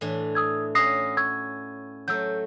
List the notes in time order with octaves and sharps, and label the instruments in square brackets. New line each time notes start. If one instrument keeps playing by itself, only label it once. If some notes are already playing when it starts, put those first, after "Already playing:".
[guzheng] A2 E3 D4
[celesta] D#6 E6 G#6
[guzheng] C#4 E4 F#4 [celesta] D#6 A#6 C7
[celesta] C#6 E6 G#6
[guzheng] F#3 A3 [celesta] E6 G6